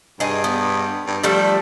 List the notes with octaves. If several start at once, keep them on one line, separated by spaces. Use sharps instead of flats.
G2 G#4 D#5
B3
G2
F3 G3 A3 A4